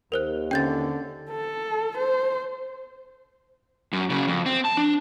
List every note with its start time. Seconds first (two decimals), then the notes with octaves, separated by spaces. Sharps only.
0.12 D#2 A#4 C5 F#6
0.51 D3 C4 C#4 C5 G5 G6 A6
1.31 A4
1.98 C5
3.93 F#2
4.10 F#2 C#3
4.28 F2
4.46 C4
4.65 A5
4.77 D4